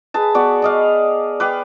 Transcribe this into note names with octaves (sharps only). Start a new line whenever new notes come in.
G#4 B4 A5
B3 F#4 D5
D5 D#5 F5
B4 D5 F5 G5